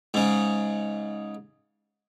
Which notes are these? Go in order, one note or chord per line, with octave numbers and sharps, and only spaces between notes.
G#2 C#3